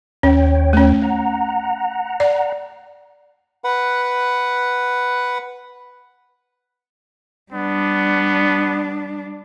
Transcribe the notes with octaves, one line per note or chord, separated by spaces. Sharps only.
D#2 C#4 C#5 G5
A3 C#4
F#5 A#5
D5
B4 F#5
G3 B3 D4